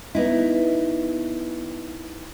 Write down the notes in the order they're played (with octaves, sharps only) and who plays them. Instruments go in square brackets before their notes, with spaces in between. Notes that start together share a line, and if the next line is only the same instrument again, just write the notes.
[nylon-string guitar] B3 D#4 E4